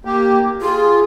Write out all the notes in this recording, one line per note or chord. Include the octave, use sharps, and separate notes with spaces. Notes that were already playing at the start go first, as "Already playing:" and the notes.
A#3 G4
F4 G#4